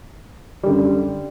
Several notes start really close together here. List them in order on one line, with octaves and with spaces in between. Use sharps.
G3 D3 F#2